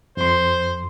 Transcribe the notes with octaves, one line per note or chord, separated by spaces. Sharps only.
F2 C5 C6